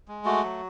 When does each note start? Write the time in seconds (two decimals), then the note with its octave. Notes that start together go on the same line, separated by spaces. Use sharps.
0.08 G#3
0.25 A3 F#4
0.44 F#3